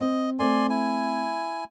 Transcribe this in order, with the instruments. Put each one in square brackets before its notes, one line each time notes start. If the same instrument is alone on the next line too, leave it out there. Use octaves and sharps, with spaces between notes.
[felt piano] C4 [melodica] D#5
[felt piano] A3 C4 [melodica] D5 G#5 C6
[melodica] E4 G#5